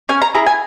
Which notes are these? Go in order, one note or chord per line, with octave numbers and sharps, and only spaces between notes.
C#4 G#5
A#5
E4 G#4 A#5
G#5